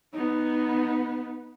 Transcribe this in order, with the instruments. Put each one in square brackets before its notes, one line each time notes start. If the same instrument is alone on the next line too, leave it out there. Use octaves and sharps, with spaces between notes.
[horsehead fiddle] B3 D#4